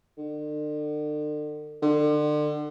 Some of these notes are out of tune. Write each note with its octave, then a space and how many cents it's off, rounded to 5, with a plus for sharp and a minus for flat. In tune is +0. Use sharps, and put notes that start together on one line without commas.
D3 +40
D3 +35